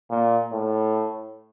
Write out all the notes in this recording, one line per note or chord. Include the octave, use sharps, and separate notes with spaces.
A#2
A2